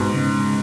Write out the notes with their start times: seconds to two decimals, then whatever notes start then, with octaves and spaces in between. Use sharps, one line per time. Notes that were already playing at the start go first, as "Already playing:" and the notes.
Already playing: G#2 B2
0.14 C#3 G#3 C#4